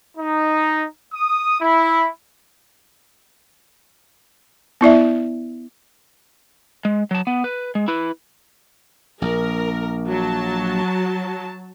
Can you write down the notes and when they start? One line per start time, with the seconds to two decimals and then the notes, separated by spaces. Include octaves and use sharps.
0.17 D#4
1.13 D#6
1.60 E4
4.81 B3 E4 D5 E5
6.85 G#3
7.11 F#3 A5
7.27 B3
7.44 B4
7.75 G#3
7.88 E4 B4
9.22 A#1 A#4
10.07 F#3 A5